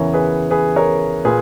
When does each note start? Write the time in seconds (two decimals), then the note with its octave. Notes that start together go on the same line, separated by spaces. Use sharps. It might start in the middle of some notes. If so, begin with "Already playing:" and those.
Already playing: E2 C#3 E3 A#4 C#5
0.13 G#4 B4
0.51 G#4 B4
0.76 A#4 C#5
1.25 A#2 G#4 B4